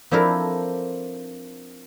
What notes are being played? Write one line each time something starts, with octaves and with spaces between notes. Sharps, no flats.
F3 C4 D4 E4 A4 A#4